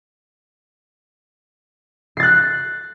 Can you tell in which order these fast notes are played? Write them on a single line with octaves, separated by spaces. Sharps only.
C7 A6 F#6